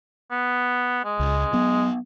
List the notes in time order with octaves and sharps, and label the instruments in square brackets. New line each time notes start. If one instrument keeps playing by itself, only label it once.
[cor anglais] B3
G#3
[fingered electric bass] C#2
F#3 B3